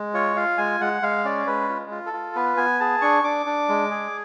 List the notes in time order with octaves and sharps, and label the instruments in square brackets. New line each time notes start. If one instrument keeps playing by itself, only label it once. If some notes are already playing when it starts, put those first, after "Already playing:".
Already playing: [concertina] G#3
F4 C#5
F4 F5
G#3 G#5
G#3 F#5
G#3 F5
C#4 D5
G#3 B4
F4
F4
A4
F4
B3 B4
B3 G#5
G#4 A5
D4 C#6
D4 D6
D4
G#3
G#4